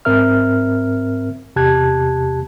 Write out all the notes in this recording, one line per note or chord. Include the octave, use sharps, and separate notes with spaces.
G#2 C4 A#4 E5 F6
E2 C3 G4 A5 F#6 G#6